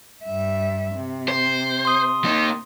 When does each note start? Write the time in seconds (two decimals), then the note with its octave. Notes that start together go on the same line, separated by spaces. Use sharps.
0.25 G2 E5
0.96 C3
1.28 C5
1.85 C6 D#6
2.24 A#3 D#4